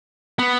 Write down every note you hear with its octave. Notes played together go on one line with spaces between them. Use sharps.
B3